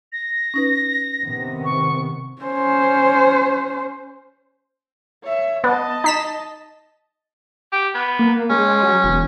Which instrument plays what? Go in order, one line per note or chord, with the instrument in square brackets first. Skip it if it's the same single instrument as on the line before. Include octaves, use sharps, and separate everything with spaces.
[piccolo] A#6
[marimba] C#4 D#4 B4
[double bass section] C3 D#3 B3
[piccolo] C#6
[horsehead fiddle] C#4 C5
C#5 E5
[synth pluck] B3 [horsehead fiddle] D#5 A5
[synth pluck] D#4 B6 E7
[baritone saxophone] G4
B3
[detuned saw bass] A#3
[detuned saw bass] G#3 [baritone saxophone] C#4
[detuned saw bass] F#3
E1